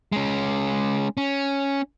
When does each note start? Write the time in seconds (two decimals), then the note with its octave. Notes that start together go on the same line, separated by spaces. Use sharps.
0.12 G#3 C#4
1.17 C#4